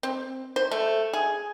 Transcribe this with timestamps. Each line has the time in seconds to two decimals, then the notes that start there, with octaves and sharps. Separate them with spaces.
0.03 C4
0.56 C5
0.71 A3
1.13 G#4